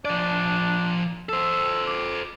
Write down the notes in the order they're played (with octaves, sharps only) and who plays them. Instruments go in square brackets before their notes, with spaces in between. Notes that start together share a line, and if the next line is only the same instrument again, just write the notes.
[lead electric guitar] F3 D5 [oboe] D4
[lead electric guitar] A4 C5 [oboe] E6
[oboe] D6